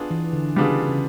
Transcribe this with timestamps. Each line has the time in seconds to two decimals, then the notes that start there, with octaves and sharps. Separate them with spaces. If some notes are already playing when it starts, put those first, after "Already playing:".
Already playing: B3 D4 F4 G#4
0.11 E3
0.33 D3
0.56 C#3 G3 B3 D4 F4 G#4
0.89 C#3